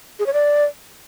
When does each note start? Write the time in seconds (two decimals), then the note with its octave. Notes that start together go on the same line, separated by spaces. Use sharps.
0.19 G#4
0.26 C#5
0.33 D5